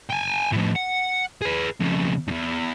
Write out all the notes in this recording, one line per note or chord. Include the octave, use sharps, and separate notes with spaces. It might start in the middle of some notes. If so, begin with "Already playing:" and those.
G5 G#5
A2 F3
F#5
G#4 B4
F2 C#3
E2 G2